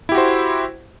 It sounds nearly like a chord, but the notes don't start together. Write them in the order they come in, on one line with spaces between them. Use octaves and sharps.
E4 G4 F#4 C5